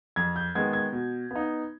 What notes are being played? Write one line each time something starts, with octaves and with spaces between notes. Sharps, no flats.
F2 G#6
G6
D#3 G#3 B3 G#6
G#6
B2
B3 D#4